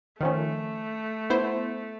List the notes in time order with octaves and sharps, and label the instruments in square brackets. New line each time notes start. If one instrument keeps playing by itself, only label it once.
[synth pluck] D#3 F3 C#4 [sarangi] A3
[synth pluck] B3 E4 C5